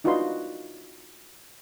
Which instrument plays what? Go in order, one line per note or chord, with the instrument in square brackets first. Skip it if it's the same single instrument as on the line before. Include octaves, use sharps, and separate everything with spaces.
[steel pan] D4 D#4 F4 F#4 B4 C6